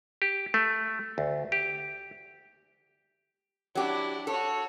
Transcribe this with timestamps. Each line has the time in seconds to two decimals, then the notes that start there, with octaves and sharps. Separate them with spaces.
0.22 G4
0.54 A3
1.18 D2
1.52 G4
3.75 F#3 D4 E4 G4
4.27 F#4 A4 C#5